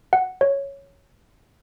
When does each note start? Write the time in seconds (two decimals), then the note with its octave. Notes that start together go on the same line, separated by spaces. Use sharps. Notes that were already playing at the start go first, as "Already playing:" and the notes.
0.13 F#5
0.41 C#5